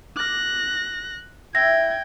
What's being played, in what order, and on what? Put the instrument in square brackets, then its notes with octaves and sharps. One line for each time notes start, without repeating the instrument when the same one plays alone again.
[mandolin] D6 F6 [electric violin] F#6 A#6
[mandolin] E4 [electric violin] G5 G#6 [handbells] A#6